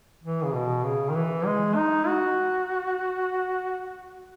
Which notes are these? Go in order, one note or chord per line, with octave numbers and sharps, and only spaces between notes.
E3
C#3
B2
C#3
D#3
E3
G#3
D#4
F#4